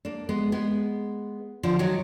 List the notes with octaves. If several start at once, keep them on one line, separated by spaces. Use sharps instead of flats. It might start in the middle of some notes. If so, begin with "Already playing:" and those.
A#3 D4
G#3 B3
G#3 B3
D3 F3
D#3 F#3